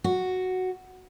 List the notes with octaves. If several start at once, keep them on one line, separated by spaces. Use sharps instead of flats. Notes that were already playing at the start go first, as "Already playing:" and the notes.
F#4